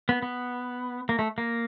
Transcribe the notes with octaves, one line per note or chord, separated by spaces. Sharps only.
B3
B3
A#3
A3
A#3